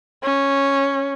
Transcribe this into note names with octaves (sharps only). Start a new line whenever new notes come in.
C#4